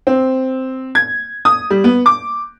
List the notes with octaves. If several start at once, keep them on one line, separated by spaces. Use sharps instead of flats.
C4
G#6
D#6
G3
B3
D6